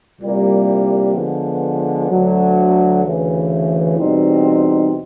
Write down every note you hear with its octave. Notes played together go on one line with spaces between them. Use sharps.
C2 A#2 G3 A#3
D3 F3 G#3 B3
D2 D3 F#3
D2 C#3 E3
E2 B2 G3 C4 D#4